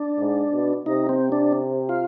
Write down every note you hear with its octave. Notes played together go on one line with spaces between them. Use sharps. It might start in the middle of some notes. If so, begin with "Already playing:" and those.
Already playing: D4
G#2
B2
C3 D#4
C4
D4
F4